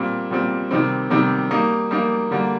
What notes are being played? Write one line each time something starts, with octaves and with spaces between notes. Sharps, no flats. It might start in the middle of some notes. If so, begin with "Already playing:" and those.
Already playing: A#2 G3 C4
A#2 G3 C4
C3 D#3 G3 C4
C3 D#3 G3 C4
G3 A#3 D#4
G3 A#3 D#4
D3 G3 A#3